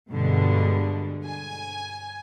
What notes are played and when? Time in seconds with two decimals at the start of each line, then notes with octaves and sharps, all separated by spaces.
0.11 G2 B2 D3 G3 G#3
1.25 G#5